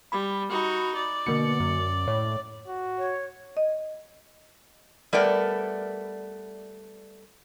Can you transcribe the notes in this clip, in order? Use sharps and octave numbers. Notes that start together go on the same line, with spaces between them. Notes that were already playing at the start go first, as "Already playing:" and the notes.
G3 B5
D#4 F#4
D5
B2 D3 A#3 C#7
F#2
A2 C#5
F#4
C#5
D#5
G3 A3 B3 A#4 D5